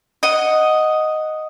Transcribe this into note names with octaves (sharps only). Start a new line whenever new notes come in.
D#5 F#5